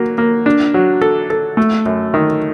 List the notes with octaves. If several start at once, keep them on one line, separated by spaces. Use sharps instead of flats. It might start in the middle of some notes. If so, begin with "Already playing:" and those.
Already playing: F#3 A#3
A#3
D4
F#3
A4
A4
A3
F#2
D#3